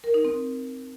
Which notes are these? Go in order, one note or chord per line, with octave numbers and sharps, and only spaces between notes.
A#4
D#4
C4